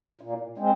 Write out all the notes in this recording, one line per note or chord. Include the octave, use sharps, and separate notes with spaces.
A#2
G#3 C4